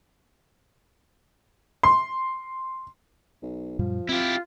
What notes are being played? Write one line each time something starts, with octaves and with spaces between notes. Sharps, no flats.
C6
B1
F#2 A#2 F3 G3
C4 E4 F4 G4